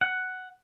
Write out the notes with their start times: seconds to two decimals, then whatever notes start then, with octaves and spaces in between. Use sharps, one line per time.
0.01 F#5